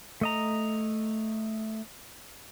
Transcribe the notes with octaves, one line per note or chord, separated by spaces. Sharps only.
A3 D#5 A#5